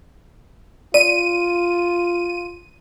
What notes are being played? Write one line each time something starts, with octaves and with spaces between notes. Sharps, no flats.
F4 D5 D#7